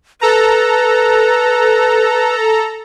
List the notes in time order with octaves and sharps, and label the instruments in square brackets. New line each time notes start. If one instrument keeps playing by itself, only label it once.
[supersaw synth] A4 A#5 [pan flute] B4